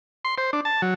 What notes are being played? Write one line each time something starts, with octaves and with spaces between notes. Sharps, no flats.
C6
C5
D4
A5
F#3